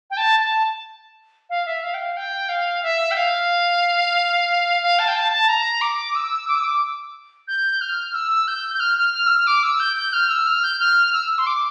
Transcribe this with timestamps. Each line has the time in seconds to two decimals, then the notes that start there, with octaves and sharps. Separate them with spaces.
0.10 G5
0.17 A5
0.39 A5
1.49 F5
1.65 E5
1.83 F5
1.94 G5
1.99 F5
2.16 G5
2.48 F5
2.83 E5
3.11 G5
3.15 F5
4.82 F5
4.99 A5
5.07 G5
5.15 A5
5.32 A5
5.48 A#5
5.81 D6
6.15 E6
6.47 D6
6.55 E6
6.63 D6
7.47 G6
7.81 F6
8.14 E6
8.47 G6
8.74 G6
8.80 F6
8.97 F6
9.13 F6
9.26 E6
9.29 F6
9.47 D6
9.63 E6
9.79 G6
9.96 G6
10.13 F6
10.29 E6
10.46 F6
10.63 G6
10.79 F6
11.13 E6
11.38 C6
11.46 D6